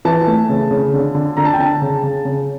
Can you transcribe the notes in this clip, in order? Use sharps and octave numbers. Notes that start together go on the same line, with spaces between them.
E3 A5
A3
C#3
C#3
D3
D3
D3 A#5
A5
G5
D3 A5
C#3
C#3
C#3